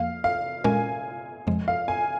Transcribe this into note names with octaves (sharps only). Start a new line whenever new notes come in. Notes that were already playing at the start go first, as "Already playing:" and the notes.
Already playing: F2 F3 A#3 F5
F5
A#2 G#3 C#4 A#4 G#5
F2 C#3 F3 G#3
F5
G#5